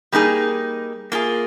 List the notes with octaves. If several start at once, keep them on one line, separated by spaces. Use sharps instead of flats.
G3 A#3 D#4 G#4
A#3 F4 G#4